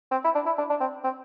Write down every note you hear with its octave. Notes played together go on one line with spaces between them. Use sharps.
C4
E4
D4
E4
D4
D4
C4
C4